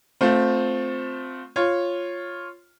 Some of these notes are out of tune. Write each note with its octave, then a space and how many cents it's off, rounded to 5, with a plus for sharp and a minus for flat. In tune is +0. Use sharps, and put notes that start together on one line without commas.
A3 +0 C4 +0 F4 +25
F4 +0 C#5 -10